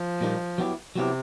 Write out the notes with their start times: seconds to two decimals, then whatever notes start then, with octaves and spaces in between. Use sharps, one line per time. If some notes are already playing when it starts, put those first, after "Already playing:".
Already playing: F3
0.21 A#2 G3 A#3 D#4
0.58 F#3 B3 E4 G4
0.96 C3 F#3 B3 E4 G4